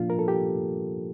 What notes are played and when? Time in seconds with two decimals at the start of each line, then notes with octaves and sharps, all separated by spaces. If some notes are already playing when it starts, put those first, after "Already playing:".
Already playing: A#2 F3 A#3 D4 F4
0.10 A#4
0.19 A4
0.28 G4